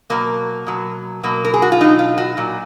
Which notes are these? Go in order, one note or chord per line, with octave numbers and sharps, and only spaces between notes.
B2 F#3 A#3
B2 F#3
B2 F#3 A#3
A#4
G#4
F#4
F4
B2 F#3 D#4
F4
F#4
A#2 F#3